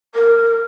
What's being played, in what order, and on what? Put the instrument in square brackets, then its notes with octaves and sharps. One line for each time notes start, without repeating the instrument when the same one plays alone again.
[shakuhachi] A#4